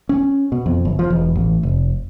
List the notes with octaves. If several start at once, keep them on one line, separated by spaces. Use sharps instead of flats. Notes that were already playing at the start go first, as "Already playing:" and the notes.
C#4
B2
F2
G1
F3
E1
A1
F1